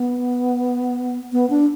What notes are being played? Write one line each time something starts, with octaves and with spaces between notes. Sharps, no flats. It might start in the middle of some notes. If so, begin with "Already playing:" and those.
Already playing: B3
B3
D4